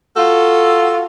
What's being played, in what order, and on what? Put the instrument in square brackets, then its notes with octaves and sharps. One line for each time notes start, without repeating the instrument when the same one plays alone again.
[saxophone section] F4 F#4 A4